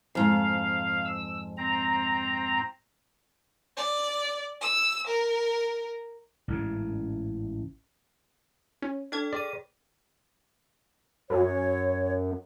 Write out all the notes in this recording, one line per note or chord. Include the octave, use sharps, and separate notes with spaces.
F2 G#2 F5
E6
C4 A#5
D5
E6
A#4
A1 G#2 C#3
C#4
D4 A4 G5 F6 G#6
G#4 D5 G5 D#7
F#2 C#5